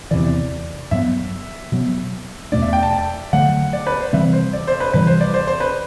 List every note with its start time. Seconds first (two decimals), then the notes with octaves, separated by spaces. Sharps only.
0.11 E2 C3 E3 D5
0.91 G2 F#3 B3 E5
1.72 B2 F#3 B3
2.52 E2 B2 A3 D4 D5
2.62 E5
2.73 G5
2.83 A5
2.93 A5
3.33 D3 F#3 A3 F#5
3.73 D5
3.87 B4
4.00 C5
4.13 C3 E3 G3 C4 E5
4.33 C5
4.53 D5
4.67 C5
4.80 B4
4.94 C3 E3 G3 B4
5.07 C5
5.21 D5
5.34 C5
5.47 C5
5.60 B4